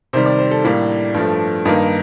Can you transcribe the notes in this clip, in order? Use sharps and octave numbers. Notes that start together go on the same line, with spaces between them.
C3 D#3 G3 C5
D5
C5
A4
A2 G3 A#3 D4
G2 F3 A3
G2 D#3 A#3 D#4